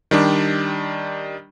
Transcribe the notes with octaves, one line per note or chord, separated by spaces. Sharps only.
D#3 G3 D4 G4